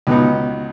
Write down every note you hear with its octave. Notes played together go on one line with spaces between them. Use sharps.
C#2 B2 B3 D#4